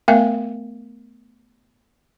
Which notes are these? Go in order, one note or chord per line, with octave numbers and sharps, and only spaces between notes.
A3 B3 A#4 E5 F5 G#5